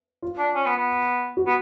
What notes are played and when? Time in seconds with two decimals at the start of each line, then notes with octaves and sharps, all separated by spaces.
0.22 F4
0.38 D4
0.55 C#4
0.66 B3
0.77 B3
1.37 F#4
1.47 B3